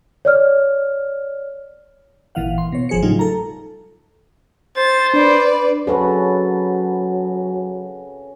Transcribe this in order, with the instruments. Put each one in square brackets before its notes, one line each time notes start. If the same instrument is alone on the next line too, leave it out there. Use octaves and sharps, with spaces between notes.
[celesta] C#5 D5 F6
[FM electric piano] G#1 A#2 E3 F5 F#5
C6
B2 C#5
G1 F3 G#4 C5 C#7
A2 C#3 F#3 G3 D#4 F4
A4 A#5
[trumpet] C5 [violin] A6
[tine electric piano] D4 [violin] B4 D5
[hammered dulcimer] C#3 F#4 [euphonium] F#3 [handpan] A4 B4 C5